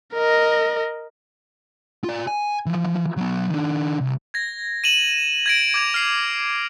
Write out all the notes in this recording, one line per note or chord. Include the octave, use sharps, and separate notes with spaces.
A#4 D#5
F4 D5
G#5
E3 F3
F#3 B3
D#3 D4
C2
G#6 A#6
D#7 E7 F#7
G#6 A#6 D7
D6 G#6 F7
F6 C7 F7